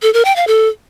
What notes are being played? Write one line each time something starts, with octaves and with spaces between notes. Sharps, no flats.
A4
A#4
G5
F5
A4